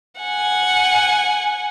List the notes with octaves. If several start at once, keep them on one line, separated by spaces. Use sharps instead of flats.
F#5 G#5